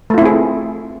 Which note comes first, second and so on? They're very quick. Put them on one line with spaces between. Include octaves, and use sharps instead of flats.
A3 F4 E4 C4 G#4